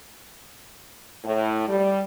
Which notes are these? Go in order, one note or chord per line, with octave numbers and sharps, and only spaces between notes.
A2
G3